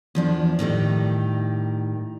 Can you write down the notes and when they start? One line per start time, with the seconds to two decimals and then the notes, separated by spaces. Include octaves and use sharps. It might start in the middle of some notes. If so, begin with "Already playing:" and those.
0.15 E2 F3 D4
0.59 A2 D#3 G3 D#4